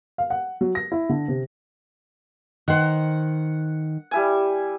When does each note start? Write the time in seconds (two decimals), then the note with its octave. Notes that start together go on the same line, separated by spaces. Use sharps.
0.18 F5
0.30 F#5
0.61 F#3
0.75 A#6
0.92 E4
1.09 D3
1.28 C3
2.68 D#3 C5 F#5
4.11 G3 E4 G#5